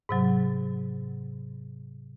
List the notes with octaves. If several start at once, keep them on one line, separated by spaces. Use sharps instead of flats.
G#2 C3 F#3